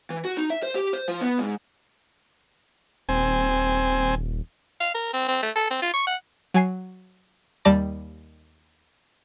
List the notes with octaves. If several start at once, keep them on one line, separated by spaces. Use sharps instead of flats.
E3
F#4
D#4
E5
C5
G4
C5
F3
B3
G#2
D#1 C4 G#5
F5
A#4
C4
C4
A3
A4
C4
F4
C#6
F#5
F#3 G#5 C7
D#2 G3 D5 A5 D6 A#6